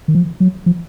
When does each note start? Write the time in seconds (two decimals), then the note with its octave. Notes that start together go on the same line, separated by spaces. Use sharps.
0.08 D#3
0.15 F3
0.40 F#3
0.66 F3